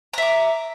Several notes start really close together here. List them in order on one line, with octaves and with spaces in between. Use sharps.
A#5 E5 D6